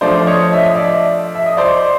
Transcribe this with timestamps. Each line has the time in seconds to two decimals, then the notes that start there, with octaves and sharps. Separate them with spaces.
0.01 F3 A3 D4 C5 D5
0.27 C#5 D#5
0.53 E5
0.64 D#5
0.75 D5 E5
1.35 E5
1.46 D#5
1.57 C5 D5